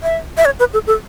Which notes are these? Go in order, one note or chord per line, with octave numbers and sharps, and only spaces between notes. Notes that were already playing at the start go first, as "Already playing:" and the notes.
E5
E5
C#5
B4
A4
A4